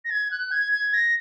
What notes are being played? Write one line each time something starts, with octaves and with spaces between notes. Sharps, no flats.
A#6
G#6
F#6
G#6
G#6
A#6